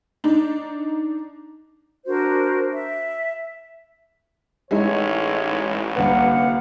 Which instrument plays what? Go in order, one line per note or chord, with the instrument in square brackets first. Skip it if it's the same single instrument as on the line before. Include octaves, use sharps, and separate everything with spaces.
[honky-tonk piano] D4 D#4
[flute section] D4 F#4 A#4 C5
E5
[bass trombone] A1 [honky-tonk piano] G#3 D#4 E4 [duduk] C#5
[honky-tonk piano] C2 D3 B4 [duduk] A#3 [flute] F#5